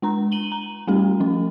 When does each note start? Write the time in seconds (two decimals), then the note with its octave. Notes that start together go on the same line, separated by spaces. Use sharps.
0.02 G#3 D4 A#5
0.32 D#7 F#7 G7
0.52 A#5
0.87 G3 A3 C#4 G4
1.20 F3 C#4